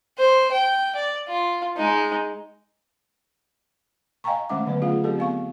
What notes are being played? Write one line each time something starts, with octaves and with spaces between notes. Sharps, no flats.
C5
G5
D5
F4
G#3 D#4
D#5 F5 G5 G#5 A#5 C#6
D#3 G#3 A3 C#4 E5 D6
D3 F#3 B3 B4
A3 C#4 F4 G#4 F5
F#3 C4 G4 A4
B3 F5 C#6